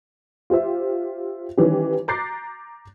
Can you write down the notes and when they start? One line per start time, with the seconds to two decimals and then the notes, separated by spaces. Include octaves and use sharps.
0.50 F4 G4 C5 E5
1.58 D#3 E3 G3 C#4 G4
2.08 A#5 D6 F#6 G6 A6 C7